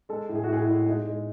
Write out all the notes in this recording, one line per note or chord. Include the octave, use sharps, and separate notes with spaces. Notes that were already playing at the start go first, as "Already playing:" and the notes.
G#3 A4
A2
G#4
F#4
A2
G#4
E4
G#3
G#3 D#4
G#3